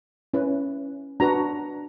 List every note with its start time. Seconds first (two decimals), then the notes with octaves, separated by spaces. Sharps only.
0.34 C#4 E4 B4
1.20 D4 F#4 B4 A#5